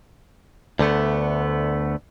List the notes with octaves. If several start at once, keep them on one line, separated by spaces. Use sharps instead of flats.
D2 D3 A3 B3